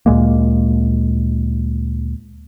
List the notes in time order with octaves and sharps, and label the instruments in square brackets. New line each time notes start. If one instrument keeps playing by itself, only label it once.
[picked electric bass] D2 A#2 G#3 A#3